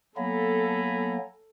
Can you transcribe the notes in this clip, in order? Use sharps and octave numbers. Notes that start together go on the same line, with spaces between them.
F#3 A#3 B3 A4 G#5 A#5 B5